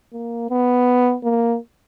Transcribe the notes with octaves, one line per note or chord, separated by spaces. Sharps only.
A#3
B3
A#3